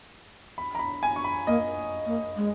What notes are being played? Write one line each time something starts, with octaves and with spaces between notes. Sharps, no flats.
B5
A#5
B5
G#5
C#6
B5
A#3 D#5
A#3
G#3